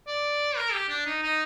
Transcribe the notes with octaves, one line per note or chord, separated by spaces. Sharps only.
D5
A#4
G4
D4
D#4
D#4